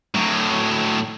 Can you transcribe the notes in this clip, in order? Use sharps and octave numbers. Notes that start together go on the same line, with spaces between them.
A2 F#3